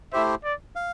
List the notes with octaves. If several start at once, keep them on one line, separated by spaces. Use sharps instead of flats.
A3 E4 G4 C5 E5
D5
F5